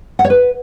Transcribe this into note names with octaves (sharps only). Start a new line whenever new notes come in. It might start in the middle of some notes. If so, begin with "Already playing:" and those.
F#5
C#5
B4